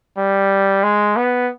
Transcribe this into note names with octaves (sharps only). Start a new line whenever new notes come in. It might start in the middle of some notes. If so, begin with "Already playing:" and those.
G3
G#3
B3